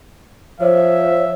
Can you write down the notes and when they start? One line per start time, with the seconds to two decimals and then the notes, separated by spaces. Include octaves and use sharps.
0.60 F3 C5 C#5 D#5 E5 D6